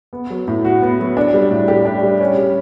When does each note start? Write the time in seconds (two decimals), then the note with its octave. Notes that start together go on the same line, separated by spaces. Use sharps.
0.13 B3
0.30 F#3
0.48 A2
0.65 F#4
0.82 B3
1.00 F#3
1.17 D4
1.34 G3
1.51 A2
1.68 G4
1.86 D4
2.03 G3
2.20 C#4
2.38 G3